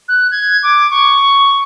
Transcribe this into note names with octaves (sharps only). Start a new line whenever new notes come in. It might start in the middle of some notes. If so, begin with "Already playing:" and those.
F#6
G#6
D6
C#6